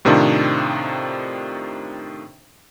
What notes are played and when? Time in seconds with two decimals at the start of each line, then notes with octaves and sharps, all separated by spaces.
0.05 A2 C3 D#3 C4 D4 F4